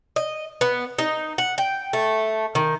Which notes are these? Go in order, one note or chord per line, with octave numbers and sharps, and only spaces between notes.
D#5
B3
D#4
F#5
G5
A3
D#3